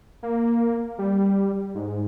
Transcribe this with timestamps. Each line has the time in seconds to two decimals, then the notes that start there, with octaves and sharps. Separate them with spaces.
0.23 A#3
0.98 G3
1.75 G#2